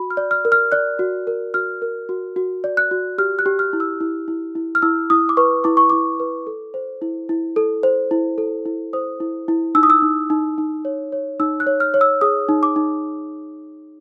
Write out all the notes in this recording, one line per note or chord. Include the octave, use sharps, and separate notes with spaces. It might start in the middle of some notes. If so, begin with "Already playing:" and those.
Already playing: F#4 B5
F6
D5
F6
A#4
F6
D5 F#6
F#4
A#4
F#4 F6
A#4
F#4
F#4
D5
F#6
F#4
G4 F6
F#6
G4
F6
E4
E6
E4
E4
E4
F6
E4 E6
E4 D#6
D6
B4 C#6
E4 D6
C#6
E4 D6
B4
A4
C5
E4
E4
A4
C5
E4
A4
E4
C5 D#6
E4
E4
D#4 E6
D#6
E6
D#4
D#4
D#4
C#5
C#5
D#4 E6
F#6
C#5
F6
C#5
E6
G#4 D#6
D#4
D6
D#4